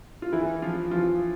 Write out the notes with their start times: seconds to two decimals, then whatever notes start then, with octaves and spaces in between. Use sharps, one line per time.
0.22 F4
0.33 E3 E4
0.62 F3 F4
0.91 F3 F4